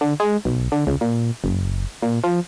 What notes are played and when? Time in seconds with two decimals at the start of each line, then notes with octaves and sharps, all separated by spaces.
0.01 D3
0.20 G#3
0.45 B1
0.72 D3
0.87 C#2
1.01 A#2
1.44 F#1
2.02 A#2
2.24 F3